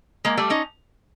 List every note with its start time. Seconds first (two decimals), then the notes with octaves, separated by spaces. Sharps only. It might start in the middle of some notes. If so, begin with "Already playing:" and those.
0.25 G#3 A#3
0.37 G3 A3
0.50 C#4 D#4